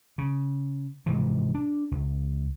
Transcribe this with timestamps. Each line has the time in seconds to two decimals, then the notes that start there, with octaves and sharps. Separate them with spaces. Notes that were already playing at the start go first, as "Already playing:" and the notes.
0.18 C#3
1.06 G#2 C3 E3 F3
1.55 D4
1.91 C#2